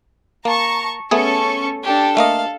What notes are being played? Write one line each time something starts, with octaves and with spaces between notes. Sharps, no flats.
A#3 A5 A#5 C#6
A3 B3 C#4 G#4 A4 C#6
D4 G4 A4
A3 A#3 D#5 F5